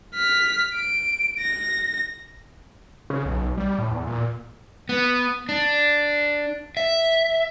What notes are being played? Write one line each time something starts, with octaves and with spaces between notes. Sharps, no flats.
F6 B6
D7
A#6
C#3
B1
G3
A2
E2
A#2
B3
D4
E5